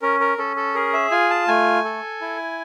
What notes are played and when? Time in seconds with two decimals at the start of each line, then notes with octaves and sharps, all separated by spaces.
0.02 C#4 A#4
0.20 A#4
0.38 C#4 A4
0.56 A4
0.75 G#4 A#4
0.94 E5
1.11 F4 G#5
1.30 A5
1.48 A3 G#5
1.85 A4
2.21 E4